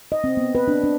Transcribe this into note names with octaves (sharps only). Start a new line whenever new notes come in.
D#5
C4
B3
B4
D4
D4